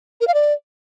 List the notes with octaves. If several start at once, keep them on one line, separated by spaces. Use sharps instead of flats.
A#4
F5
D5